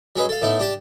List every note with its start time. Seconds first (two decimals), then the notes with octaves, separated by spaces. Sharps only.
0.16 F#3 C#4 G#4 B4 D#5
0.29 A4 F5
0.42 A2 A3 B3 D#4
0.59 D4 G4 A5